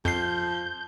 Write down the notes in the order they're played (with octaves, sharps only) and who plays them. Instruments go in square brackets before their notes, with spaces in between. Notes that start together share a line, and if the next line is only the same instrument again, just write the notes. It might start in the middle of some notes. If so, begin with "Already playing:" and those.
[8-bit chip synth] F2 C7 [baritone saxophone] F3 [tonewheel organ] G6